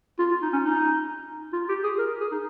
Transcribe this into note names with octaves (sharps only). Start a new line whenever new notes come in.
F4
F4
D#4
C#4
D#4
F4
G4
G#4
A#4
G#4
D#4